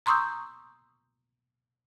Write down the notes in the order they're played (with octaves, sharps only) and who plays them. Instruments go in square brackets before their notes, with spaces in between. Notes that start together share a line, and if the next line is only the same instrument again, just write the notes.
[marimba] A#5 C6 C#6 D#6 E6 G6